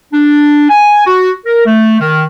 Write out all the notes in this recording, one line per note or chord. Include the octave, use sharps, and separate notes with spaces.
D4
G#5
F#4
A#4
A3
D#3